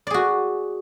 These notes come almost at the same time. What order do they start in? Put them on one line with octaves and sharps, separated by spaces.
D5 G#4 F#4